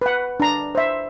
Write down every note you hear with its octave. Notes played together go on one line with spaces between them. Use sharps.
B4 F#5
D4 A#5
C5 E5